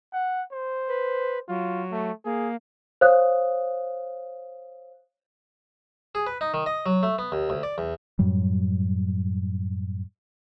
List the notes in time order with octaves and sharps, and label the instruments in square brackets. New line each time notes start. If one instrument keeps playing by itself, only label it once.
[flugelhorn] F#5
C5
[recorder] B4
[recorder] F#3 [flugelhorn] F4
[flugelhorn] A3
[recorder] A#3 [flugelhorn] G#4
[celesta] C5 C#5 F5 D#6 F#6
[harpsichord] G#4
B4
D#4
D#3
D#5
F#3
A3
B3
D#2
D2
D5
E2
[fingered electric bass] F#2 A2 F#3 G3